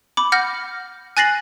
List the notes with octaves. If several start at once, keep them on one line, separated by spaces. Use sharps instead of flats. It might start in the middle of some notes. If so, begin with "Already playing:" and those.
B5 D6
F#5 F6 G6 A#6
G#5 F#6 A6 A#6 C7 F#7